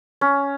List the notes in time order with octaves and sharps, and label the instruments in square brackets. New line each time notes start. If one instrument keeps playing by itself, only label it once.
[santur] C#4